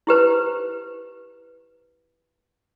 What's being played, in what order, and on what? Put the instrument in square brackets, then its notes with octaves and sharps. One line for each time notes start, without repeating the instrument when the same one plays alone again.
[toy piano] E4 G4 B4 C5